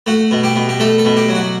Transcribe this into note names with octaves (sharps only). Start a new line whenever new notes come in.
A3 F#4
B2
G4
B2
G4
A3 A4
A4
B2
G4
F#3
F#4